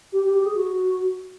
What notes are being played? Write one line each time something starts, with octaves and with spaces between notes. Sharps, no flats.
G4
G4
G4
G#4
F#4